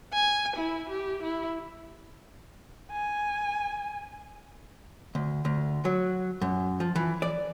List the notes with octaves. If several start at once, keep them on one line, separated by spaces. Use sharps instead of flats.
G#5
E4
G4
E4
G#5
D2
D2
F#3
F#2
F3
E3
D5